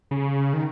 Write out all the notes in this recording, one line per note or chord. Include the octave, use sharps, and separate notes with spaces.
C#3
D#3